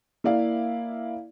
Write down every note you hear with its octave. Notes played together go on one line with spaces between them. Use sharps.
A#3 E4 D5 F5